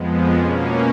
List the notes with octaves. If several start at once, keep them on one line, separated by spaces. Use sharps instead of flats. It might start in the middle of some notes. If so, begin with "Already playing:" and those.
Already playing: F2 F3 G#3 B3
B2 A#3 C#4